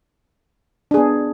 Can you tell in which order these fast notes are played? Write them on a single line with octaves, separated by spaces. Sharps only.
D4 G#4 B3